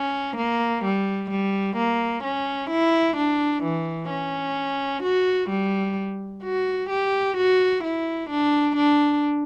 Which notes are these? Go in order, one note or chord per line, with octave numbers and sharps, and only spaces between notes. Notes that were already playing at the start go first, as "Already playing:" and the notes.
Already playing: C#4
A#3
G3
G3
A#3
C#4
E4
D4
E3
C#4
F#4
G3
F#4
G4
F#4
E4
D4
D4